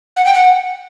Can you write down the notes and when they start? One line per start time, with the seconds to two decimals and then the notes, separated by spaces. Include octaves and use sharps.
0.16 F#5
0.25 G5
0.34 F#5